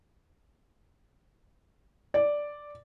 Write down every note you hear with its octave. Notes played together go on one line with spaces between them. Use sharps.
D5